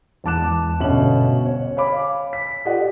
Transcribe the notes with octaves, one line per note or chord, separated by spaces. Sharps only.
E2 G#3 A5 D6 F#6 E7
G1 B2 C#4 E5 F#7
C#5
C#5 F5 G#5 B5 D6
B6
F4 G4 A4 D5 D#5 F#5